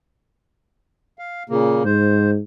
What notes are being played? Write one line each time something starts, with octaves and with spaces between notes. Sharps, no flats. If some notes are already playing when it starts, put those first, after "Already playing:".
F5
A#2 C#3 A#3
G#2 C5